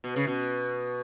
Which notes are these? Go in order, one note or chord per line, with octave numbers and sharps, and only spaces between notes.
B2
C#3
B2